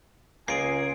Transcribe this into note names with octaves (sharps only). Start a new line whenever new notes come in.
C#2 A#3 F4 G#4 G#5 C7 D7